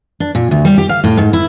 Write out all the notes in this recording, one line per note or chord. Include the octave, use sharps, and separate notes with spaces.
D4
A#2
D2
G3
G4
F5
A2
G#2
E4